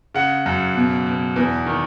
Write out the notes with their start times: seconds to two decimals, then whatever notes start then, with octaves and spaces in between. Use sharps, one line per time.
0.15 C#3 F#5
0.46 F#2
0.76 B2
1.06 B2
1.36 E2
1.66 D#3